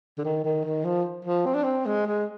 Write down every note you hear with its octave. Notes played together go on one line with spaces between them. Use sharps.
D3
D#3
D#3
D#3
F3
F3
C4
D4
C4
G#3
G#3